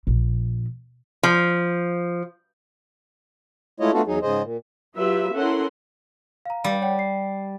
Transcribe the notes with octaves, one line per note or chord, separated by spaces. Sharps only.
A#1
F3
G#3 A3 E4 F4 C#5 D#5
A3 B3 D4 F4 F#4 A4
E2 F#3 D#4 G#4
G#2 C#3 G#4 C5 D#5
A#2
F#3 F4 G4 B4 E5
C#4 E4 A4 A#4 F#5 C6
F5 A#5
G3 F5
C#5 F#5 G5
C7